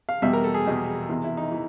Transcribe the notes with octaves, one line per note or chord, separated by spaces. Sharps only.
F5
E2 B2 G3 E5
A#4
A4
G#4
E2 B2 G3
E2 C3 E3
E4
D#4
E3